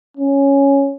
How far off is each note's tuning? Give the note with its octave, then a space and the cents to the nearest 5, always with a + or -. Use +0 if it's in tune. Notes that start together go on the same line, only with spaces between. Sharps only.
C#4 +0